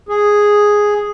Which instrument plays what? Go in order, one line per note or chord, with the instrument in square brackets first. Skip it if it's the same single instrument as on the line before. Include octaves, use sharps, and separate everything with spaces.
[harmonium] G#4